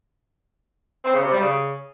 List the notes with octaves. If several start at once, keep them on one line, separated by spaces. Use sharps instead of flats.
C4
C#3
C3
G3
C#3